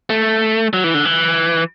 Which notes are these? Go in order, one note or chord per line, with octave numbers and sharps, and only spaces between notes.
A3
F#3
E3
D3
E3